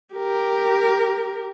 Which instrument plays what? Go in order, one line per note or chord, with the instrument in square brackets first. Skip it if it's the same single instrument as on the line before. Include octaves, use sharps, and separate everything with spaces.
[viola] G4 A#4